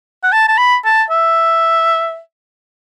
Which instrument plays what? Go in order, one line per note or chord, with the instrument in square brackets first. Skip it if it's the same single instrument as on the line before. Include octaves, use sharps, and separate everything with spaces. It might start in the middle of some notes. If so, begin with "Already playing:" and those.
[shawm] F#5
A5
A5
B5
A5
E5